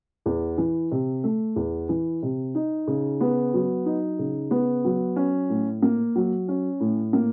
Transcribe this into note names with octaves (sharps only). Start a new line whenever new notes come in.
E2
E3
C3
A3
E2
E3
C3
D#4
C#3
B3
F#3
D#4
C#3
B3
F#3
C#4
A2
A#3
F#3
C#4
A2
A#3